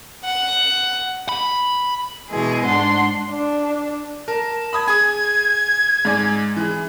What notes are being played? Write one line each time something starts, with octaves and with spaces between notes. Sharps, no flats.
F#5
B5
B2 E3 G#3 G#4
G#2 D4 F#5 C6
D4
A#4 A5
B5 D#6 G#6
G#4 D#6 G#6
G#2 D5 G#5
E3 G#4